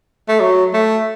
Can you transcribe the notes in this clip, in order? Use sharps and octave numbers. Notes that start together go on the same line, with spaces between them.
A3
F#3
A3